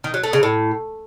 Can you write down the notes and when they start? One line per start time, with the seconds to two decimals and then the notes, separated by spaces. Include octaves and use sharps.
0.04 D#3
0.14 F#3
0.23 A3
0.33 C#3
0.43 A2